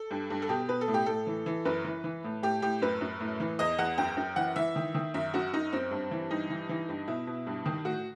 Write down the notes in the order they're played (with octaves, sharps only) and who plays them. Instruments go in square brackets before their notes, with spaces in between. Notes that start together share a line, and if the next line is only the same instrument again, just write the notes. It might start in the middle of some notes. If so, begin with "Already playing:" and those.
Already playing: [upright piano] A4
G2
G2
A4
B2 G4
B2 B4
A4
A2
G4
A2 A4
E3
E3
F#2 B4
E3
E3
A2
A2 G4
A2 G4
F#2 B4
F#2
A2
E3
E2 D#5
E2 F#5
F#2 G5
F#2
E3 F#5
E3 E5
D#3
D#3
F#2 E5
F#2 F#4
F#2 D#4
F#2 C4
G2
E3
G2 D#4
E3
E3
G2
B2 E4
B2
G2
D#3
A2 F#4